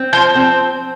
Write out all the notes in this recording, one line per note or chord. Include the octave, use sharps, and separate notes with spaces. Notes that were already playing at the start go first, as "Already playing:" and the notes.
Already playing: C4
F3 C5
C4